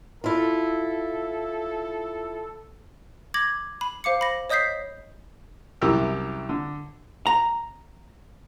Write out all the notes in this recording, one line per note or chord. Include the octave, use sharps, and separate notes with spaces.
E4 F4 A4
D6 G#6 A#6 F#7
B5
C5 F5 D6 C#7
B5 A#6
C#5 D#5 D#6 G6 B6 C7
C2 F#2 E4 G4 A#4 E6
D3
A#5